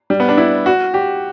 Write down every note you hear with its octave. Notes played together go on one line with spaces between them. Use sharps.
G3
B3
D4
E4
F#4
G4